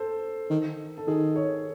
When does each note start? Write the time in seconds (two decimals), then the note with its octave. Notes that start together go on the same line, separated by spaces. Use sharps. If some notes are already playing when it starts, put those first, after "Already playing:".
Already playing: A4 C5
0.50 D#3
0.97 A4
1.07 D#3 G#4
1.36 C#5